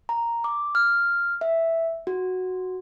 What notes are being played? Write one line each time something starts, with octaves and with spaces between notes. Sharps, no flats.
A#5
D6
F6
E5
F#4